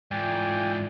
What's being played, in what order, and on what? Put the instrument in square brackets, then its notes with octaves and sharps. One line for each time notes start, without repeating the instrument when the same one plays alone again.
[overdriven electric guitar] G#2 E3 [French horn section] A3 E4 F4 [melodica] D5 [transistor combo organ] G5 G#5